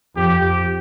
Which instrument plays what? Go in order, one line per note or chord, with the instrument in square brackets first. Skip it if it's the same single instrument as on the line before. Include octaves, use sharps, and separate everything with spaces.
[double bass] F2 [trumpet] G4